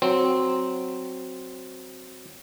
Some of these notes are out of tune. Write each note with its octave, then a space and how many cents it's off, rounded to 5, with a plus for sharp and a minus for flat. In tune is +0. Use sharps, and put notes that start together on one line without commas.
F#3 +0 C4 +0